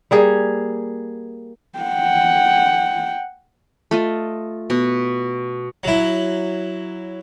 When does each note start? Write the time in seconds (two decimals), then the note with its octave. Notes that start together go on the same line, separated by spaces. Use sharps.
0.11 G3 A#3 G#4
1.79 F#5 G5
3.91 A3 F4 D#5
4.70 B2
5.84 F#3 E4